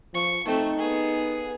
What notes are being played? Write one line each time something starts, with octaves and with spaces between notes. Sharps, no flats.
F3 C#6
A3 C4 D#4
B3 G#4